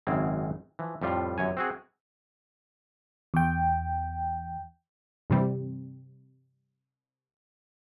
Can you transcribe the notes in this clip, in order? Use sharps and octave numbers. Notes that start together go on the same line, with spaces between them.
G#1 F#2 C#3 C4 G#4
E3 F3
F2 A2 G3 F4
G1 F#2 C#5 G#5
C4 F#4 G#4
E2 G5
G2 C3 E3 G3 C4